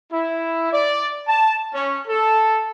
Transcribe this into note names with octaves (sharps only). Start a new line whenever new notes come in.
E4
D5
A5
C#4
A4